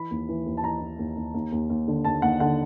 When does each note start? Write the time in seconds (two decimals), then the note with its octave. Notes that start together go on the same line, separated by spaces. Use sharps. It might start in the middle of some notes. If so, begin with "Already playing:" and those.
Already playing: E3 B5
0.11 D#2
0.29 E3
0.46 D#2
0.57 A5
0.64 E3 A#5
0.81 E3
0.99 D#2
1.17 D#2
1.34 D#2
1.52 D#2
1.70 D#2
1.88 D3
2.05 D#2 A5
2.22 D#2 F#5
2.40 D3 F#5